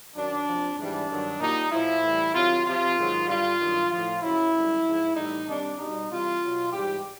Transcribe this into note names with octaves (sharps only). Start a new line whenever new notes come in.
F#2 D#3 F#3 D4
C3 F3
G#2 E3 G3 D4
G2 D#3 F#3
A#2 G3 D#4
A2 F3 E4
A2 E3 G3
C3 D#3 F#3 F4
C3 F3 F4
G#2 D#3 F#3
G2 D3 G3 F4
G2 D#3 F#3
A2 F3 F4
F#2 C#3 F#3 E4
F#2 D3 G3
G#2 F3
A2 E3 G3 D#4
C3 D#3 G3 D4
B2 G3 D#4
C3 E3 G3 F4
B2 F#3
G#2 E3 G3 G4